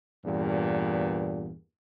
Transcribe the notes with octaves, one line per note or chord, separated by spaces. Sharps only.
E2 G2 A#2